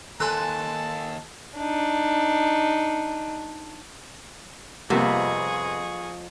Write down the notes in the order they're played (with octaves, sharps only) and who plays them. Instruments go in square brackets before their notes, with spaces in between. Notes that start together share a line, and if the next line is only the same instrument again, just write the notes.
[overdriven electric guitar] D#2 [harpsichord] A4 [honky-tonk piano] G#5 C6 F#6 [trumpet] A5
[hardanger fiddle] D4 D#4
[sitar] F2 [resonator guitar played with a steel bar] C3 B3 [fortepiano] G3 A#3 F4 [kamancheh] G#4 C#6